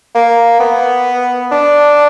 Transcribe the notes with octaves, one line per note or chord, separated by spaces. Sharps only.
A#3
B3
D4